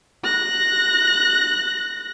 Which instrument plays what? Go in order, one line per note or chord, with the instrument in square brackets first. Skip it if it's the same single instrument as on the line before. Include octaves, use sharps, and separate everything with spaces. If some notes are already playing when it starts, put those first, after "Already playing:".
[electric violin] F#6 A#6